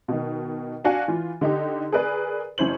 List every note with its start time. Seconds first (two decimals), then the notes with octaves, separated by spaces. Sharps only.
0.08 B2 D#3
0.85 D4 F#4 F5 G#5
1.08 E3 F4
1.41 D3 D#4 G4
1.92 G#4 A#4 B4 D5
2.58 F#1 C#4 E4 C5 F#7